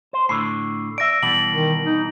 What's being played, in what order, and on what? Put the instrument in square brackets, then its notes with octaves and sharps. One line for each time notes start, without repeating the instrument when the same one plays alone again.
[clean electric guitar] C5
[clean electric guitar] A2 D3 [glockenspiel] C7
[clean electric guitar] D5 E5 [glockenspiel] A#6 D7
[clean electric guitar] B2 E3 G3 [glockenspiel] F#7
[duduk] D#3
D#4